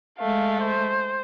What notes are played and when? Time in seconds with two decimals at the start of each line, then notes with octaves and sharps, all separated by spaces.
0.19 G#3 A3 F5
0.62 C5